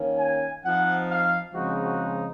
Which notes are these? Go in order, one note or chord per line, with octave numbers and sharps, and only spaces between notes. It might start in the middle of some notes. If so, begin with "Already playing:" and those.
Already playing: D#3 A#3 C#4
G#5
F3 C4 D#4 F#5
F5
C#3 F3 G#3 C4 D#4 F#4
F#4